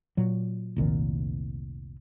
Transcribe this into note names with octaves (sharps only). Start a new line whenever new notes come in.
A#2 F#3
F1 C2 A#2 D#3